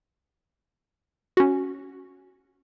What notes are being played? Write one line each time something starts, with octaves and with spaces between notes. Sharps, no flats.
C#4 F#4